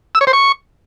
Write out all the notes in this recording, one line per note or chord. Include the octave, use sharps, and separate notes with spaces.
E6
C#5
C5
C#6